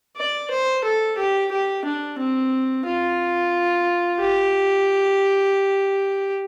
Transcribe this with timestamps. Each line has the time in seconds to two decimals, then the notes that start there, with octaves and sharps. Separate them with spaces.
0.17 D5
0.50 C5
0.84 A4
1.18 G4
1.51 G4
1.85 D4
2.19 C4
2.86 F4
4.20 G4